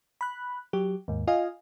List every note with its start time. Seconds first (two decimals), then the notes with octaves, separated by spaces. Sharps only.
0.21 B5 F#6
0.73 F#3 G4
1.08 D#2 G#2
1.27 F4 D#5 F5 G#5